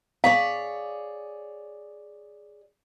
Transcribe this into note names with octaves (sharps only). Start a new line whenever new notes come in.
G#4 C#5 D5 F5